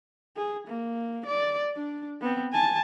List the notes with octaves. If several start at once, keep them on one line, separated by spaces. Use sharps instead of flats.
G#4
A#3
D5
D4
B3 C4
G#5 A5